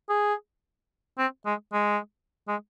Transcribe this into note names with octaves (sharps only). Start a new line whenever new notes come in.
G#4
C4
G#3
G#3
G#3